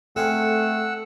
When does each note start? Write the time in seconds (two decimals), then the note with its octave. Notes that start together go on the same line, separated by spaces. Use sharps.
0.16 A3 C4 G#4 A4 F5 F#5 E6